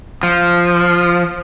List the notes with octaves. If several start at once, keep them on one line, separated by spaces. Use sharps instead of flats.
F3